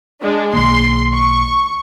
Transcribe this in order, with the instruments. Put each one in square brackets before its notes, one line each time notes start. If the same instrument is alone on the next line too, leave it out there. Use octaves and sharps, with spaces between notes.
[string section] G#3 D4
[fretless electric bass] B1 D#3 A#3 [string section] C6
[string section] C#6